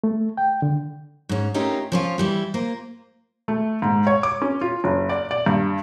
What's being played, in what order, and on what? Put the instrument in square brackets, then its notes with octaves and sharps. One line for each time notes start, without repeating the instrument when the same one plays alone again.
[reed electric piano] A3
G5
D3
[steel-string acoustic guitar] G#2 C#4
A3 C#4 D#4 F4 G4 A#4
F3 C#4 F4
E3 G3 E4
A#3 F4 C5
[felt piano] A3
G#2
C#5
D6
C#4
F4
F#1
D5
D5
G2